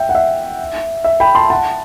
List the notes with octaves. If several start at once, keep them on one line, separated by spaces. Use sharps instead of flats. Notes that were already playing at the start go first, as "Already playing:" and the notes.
Already playing: E5 G5
F#5
E5
E5
G5 B5
A5 C6
F#5 A5